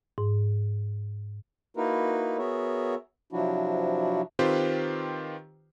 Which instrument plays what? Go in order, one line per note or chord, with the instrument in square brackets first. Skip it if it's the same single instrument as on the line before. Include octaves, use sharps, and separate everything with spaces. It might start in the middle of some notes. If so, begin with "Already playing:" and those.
[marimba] G#2
[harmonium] A#3 D#4 E4 F#4 A#4 B4
B3 F#4 G#4 A#4 C#5 E5
C3 F3 F#3 D4 E4 F#4
[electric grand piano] D#3 C4 F4 G4 B4 C5